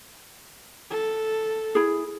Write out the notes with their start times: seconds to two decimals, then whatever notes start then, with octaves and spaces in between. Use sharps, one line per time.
0.90 A4
1.75 E4 G#4